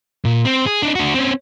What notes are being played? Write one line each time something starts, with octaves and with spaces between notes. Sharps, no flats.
A#2
C4
G#4
D4 D#4
D4 F#4
C4 C#4